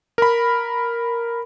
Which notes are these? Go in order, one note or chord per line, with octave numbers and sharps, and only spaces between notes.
A#4 B5